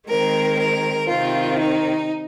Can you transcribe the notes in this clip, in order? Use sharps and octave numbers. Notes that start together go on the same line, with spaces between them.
D#3 G#3 C4 A#4
A#4
C3 D#3 C4 F4
D#4